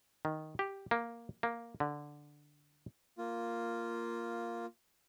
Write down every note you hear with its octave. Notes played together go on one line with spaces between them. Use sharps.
D#3
G4
A#3
A#3
D3
A#3 F4